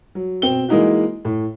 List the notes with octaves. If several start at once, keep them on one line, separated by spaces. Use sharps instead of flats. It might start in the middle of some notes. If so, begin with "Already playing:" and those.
F#3
B2 C4 G7
E3 G#3 A#3 D#4 E4 F#4
A2